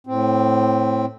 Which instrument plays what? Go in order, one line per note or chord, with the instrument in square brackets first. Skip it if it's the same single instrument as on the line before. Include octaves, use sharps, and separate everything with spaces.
[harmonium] A2 C4